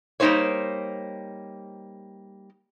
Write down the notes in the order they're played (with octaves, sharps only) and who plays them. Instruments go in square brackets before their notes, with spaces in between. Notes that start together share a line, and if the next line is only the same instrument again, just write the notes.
[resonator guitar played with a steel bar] G3 A#3 C#4 D#4 C5 C#5